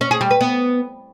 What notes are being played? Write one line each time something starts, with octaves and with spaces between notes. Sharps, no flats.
C#4
G#4
G3
B4
B3